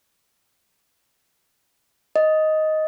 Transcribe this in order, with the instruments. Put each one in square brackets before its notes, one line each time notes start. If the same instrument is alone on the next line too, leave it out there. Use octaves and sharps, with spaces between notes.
[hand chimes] D#5